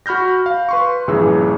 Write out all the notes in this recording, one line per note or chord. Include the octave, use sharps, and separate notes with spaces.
F#4 B5 F6 G6 A#6
F5
B4 C6 C#6
A#1 G2 C#3 E3 G#4 E6